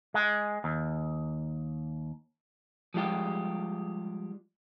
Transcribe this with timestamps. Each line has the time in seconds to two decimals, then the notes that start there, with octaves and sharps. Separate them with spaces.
0.14 G#3
0.64 D#2
2.94 F3 G3 G#3 F4 G4